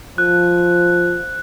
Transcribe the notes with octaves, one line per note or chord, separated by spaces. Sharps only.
F3 F#6